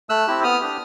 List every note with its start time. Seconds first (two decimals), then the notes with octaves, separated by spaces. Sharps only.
0.09 A3 E6 F#6
0.27 C4 E4 G4
0.43 B3 D#6 F6
0.60 D4 G4